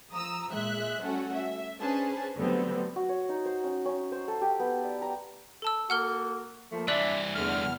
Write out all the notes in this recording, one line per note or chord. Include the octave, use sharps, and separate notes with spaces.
F3 A#5 D#6 E6
A#2 G#3 E5 F#6
G3 A3 C#4 F#4 A4
E5
C#4 D4 G#4 B4 C5 A5
D3 F#3 G3 A3 B3 C4
F#4
C#5
D#4
C5
C#4
C#4
C5
A4
G4
B3
D5
A#5
A4 A5 E6
A#3 F#4 A4 F#5 F6 G7
F3 A3 A#3
C2 E3 D4 D5 E5 F#6 F#7
E2 D3 A3 F6